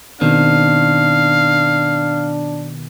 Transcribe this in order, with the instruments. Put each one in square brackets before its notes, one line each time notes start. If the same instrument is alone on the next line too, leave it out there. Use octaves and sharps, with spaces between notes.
[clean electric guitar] B2 D#3 C4 [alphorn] D4 [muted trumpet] F5